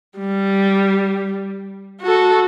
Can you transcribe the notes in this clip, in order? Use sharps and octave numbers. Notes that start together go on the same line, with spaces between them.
G3
F#4 A4